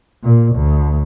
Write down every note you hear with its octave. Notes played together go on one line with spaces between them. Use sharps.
A#2
D2